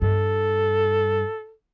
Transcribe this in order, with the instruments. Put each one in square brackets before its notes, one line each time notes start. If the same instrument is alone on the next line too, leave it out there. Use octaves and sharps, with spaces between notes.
[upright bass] G2 [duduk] A4